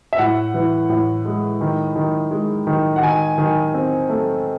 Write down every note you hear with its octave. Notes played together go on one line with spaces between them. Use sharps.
E5
A2 F#5
E3
A2
G#3
D#3
D#3
G#3
D#3
F#5
D#3 G#5
D#3
C4
A3